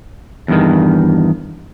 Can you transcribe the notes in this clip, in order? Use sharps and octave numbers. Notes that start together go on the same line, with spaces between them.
E2 G2 D#3